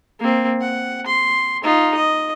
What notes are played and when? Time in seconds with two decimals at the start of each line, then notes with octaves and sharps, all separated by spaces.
0.20 A#3 C4
0.61 F#5
1.07 C6
1.63 D#4 F4
1.95 D#5